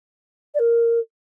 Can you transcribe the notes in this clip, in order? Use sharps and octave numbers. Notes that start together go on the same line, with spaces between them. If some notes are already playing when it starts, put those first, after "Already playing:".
D5
A#4